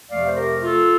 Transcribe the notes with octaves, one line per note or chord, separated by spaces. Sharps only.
F2 C3 F3 A3 D5 F5
C5
G4 A#4
F4 A4